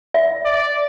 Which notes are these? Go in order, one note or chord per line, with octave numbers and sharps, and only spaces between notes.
E5
D5